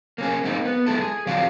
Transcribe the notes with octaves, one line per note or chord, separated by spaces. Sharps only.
A#3 C#4 G#4
G#3 A#3 C4 D#4
B3
G#3 E4 A4
G#4
F3 C4 F#4 D5 F5